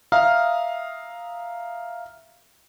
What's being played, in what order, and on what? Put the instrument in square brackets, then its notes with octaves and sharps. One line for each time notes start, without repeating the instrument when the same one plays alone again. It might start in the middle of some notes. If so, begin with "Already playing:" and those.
[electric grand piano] E5 F5 A#5 D#6 F6